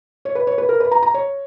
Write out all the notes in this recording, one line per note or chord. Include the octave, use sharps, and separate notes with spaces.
C#5
B4
C#5
B4
A#4
B4
A#5
A#5
C#5